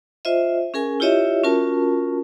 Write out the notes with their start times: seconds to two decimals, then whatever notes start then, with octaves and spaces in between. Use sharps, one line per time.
0.25 F4 C5 D#5 E5
0.74 C#4 G#4 A#4 G#5
1.00 E4 F4 G4 C#5 D#5 E5
1.44 C#4 F4 F#4 A#4 A5